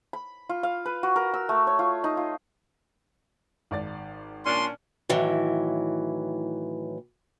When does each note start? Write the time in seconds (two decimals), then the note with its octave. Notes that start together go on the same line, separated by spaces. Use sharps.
0.13 B5
0.49 F4
0.63 F5
0.86 B4
1.03 F#4
1.16 A#4
1.34 E6
1.49 A3
1.67 C#5
1.79 F4
2.04 D#4
2.17 F4
3.71 G#1 D5 A6
4.45 A#2 C#4 D4 C6
5.09 A2 D#3 E3 F#3